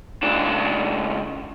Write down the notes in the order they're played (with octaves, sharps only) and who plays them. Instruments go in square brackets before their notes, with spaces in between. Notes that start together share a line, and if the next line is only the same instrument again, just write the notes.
[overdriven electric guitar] C#2 D4